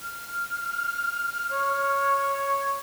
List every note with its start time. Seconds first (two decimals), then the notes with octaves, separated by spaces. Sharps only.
0.02 F6
1.52 C#5